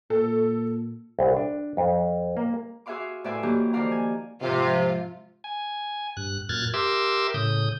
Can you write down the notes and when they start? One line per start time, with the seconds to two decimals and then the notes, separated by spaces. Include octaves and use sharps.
0.10 A#2 A4
1.19 C2
1.36 D4
1.77 F2
2.37 A#3
2.86 F#4 G#4 E5 F5 C6 D6
3.24 A2 B4 D5 E5 G#5 C6
3.43 E3 F#3 A#3 D#4 F#4 G4
3.73 D#3 F3 A4 D5 F5 A#5
3.92 G#5
4.42 G#2 C3 F3 F4
5.44 G#5
6.17 G2 F#6
6.49 F#2 A#2 F6 F#6 G#6 A6
6.74 G4 A#4 E5 C6 D6 E6
7.34 A2 C#3 D#6 G6